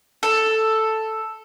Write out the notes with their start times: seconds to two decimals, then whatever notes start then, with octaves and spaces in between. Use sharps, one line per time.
0.23 A4